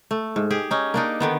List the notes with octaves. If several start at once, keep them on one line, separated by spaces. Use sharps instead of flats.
A3
G#2
G4 G#4
C#4 D#4
A#3 D4 D#4
D3 D#3 B3